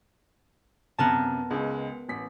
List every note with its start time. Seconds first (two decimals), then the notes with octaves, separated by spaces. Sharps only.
0.99 F#2 C3 B3 A#4 A5
1.50 C#2 G#3
2.09 A1 B6